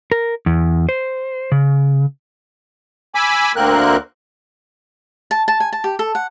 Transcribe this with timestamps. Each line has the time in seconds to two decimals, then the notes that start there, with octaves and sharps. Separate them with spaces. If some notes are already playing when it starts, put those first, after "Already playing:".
0.12 A#4
0.46 E2
0.89 C5
1.52 C#3
3.15 G#5 B5 D6 E6
3.56 D2 D3 A#3 C4 A#4 F#6
5.31 A5
5.48 A5
5.60 G#5
5.73 A5
5.84 G4
5.99 A4
6.15 F#5